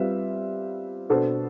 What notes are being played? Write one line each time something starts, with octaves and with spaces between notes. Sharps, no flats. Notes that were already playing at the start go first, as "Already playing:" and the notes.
Already playing: G3 C4 F4 B4 E5
B2 B3 D4 A4 C5